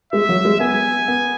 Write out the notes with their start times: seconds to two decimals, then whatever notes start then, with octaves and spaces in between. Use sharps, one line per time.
0.13 G#3 E5
0.29 F#3
0.45 G#3
0.60 B3 G#5
1.08 B3